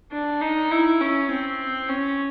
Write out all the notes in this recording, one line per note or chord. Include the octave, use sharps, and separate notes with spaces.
D4
D#4
E4
C#4
C4
C#4